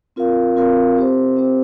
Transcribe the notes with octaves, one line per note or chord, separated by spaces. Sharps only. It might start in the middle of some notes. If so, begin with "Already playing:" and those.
C4 F4 A#4 F5
C4 F4 A#4 F5
C4 G4 C5
C4 G4 C5